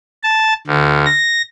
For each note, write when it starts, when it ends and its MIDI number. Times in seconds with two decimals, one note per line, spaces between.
0.24 0.54 81
0.67 1.05 38
1.06 1.42 94